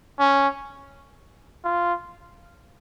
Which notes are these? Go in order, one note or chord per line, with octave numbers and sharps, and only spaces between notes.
C#4
F4